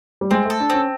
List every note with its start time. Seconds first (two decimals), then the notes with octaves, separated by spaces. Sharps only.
0.21 G3
0.31 G#3 C4
0.45 A3 A4
0.60 D4
0.70 C4 C#4